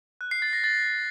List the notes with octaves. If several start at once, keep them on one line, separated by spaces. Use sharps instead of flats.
F#6
C7
A6
A#6
A6